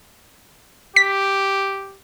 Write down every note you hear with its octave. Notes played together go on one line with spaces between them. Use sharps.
G4 B6